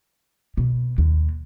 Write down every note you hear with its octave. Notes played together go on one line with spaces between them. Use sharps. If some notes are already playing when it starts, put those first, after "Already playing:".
B2
D#2